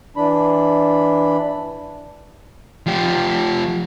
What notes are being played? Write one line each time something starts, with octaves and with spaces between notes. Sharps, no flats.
E3 D4 B5
F3 G4